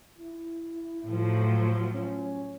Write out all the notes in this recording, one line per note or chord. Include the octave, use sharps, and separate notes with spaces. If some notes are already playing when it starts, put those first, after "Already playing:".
E4
A2 F3 F#3
C#4